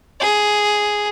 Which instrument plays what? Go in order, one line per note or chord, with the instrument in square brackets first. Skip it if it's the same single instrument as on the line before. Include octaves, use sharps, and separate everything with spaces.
[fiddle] G#4